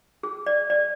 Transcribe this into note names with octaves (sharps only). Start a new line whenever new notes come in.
G#4
D5
D5